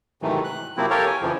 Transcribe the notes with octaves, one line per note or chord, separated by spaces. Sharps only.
G#2 C3 D#3 E3 F#3 A3
F#6
C3 F3 F#3 A#3 C4 E4
G4 A4 A#4 C#5 F5
G#5
F2 C#3 E3 F3